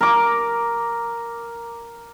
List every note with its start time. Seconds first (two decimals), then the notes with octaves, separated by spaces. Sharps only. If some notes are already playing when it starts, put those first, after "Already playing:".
0.01 A#4 D6